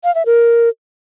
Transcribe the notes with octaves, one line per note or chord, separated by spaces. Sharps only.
F5
E5
A#4